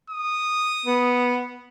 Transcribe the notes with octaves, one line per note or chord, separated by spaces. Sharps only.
D#6
B3